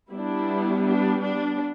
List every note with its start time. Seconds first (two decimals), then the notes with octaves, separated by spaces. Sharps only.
0.11 G3 B3 D4 E4
0.87 D4
1.23 D4